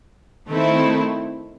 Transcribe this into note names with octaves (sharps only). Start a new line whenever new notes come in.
D#3 A3 C4 E4